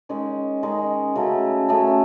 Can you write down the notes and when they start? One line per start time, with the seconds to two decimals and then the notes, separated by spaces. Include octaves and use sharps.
0.09 D#3 G#3 C#4
0.63 D#3 G#3 C#4
1.16 C#3 F#3 A3
1.69 C#3 F#3 A3